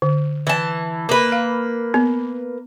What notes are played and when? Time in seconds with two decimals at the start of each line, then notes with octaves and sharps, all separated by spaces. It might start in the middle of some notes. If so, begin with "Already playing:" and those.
0.02 D3
0.47 E3 A5
1.09 A#3 B4
1.32 F5
1.94 B3